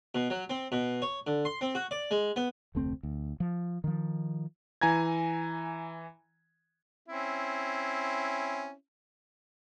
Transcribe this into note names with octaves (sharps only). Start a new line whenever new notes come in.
B2
F#3
C4
B2
C#5
D3
C6
C4
F#4
D5
G#3
B3
F1 D2 A3 C4
D2
F3
D#3 F3
E3 G#5 A#5 G#6
C4 C#4 E4